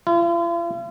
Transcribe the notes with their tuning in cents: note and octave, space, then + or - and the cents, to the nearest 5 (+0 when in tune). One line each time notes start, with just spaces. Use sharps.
F4 -45